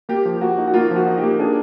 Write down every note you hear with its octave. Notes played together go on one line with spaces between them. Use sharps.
A#3 G4
F3
A#3 F#4
D#4
F#4
A#3 F4
F3
F#4
D#4
G4
A#3
D4 G#4